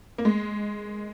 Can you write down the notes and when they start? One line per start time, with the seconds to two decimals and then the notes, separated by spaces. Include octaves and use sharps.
0.18 A#3
0.25 G#3